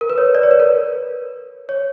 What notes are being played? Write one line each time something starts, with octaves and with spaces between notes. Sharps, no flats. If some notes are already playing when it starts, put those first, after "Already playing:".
A#4
B4
C#5
B4 D5
C#5
B4
A#4
C#5